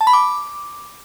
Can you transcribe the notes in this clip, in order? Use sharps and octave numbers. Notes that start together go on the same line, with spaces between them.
A5
B5
D6